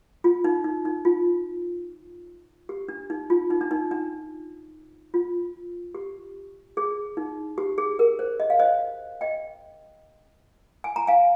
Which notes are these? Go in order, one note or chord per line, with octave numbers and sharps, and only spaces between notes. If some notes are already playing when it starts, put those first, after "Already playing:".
F4
D#4
D#4
D#4
F4
G4
D4
D#4
F4
D#4
D4
D#4
D4
F4
G4
G#4
D#4
G4
G#4
A#4
C5
D#5
F5
C5 D#5
D#5 G5
G#5
A#5
F5 G#5